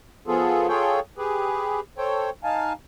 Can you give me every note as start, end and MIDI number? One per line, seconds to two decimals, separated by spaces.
0.27 0.68 53
0.27 0.68 59
0.27 0.68 65
0.27 0.68 68
0.27 0.68 69
0.68 1.00 65
0.68 1.00 68
0.68 1.00 69
0.68 1.00 73
0.68 1.00 79
1.18 1.80 67
1.18 1.80 68
1.18 1.80 71
1.98 2.30 69
1.98 2.30 72
1.98 2.30 73
1.98 2.30 79
2.44 2.73 63
2.44 2.73 77
2.44 2.73 80
2.44 2.73 81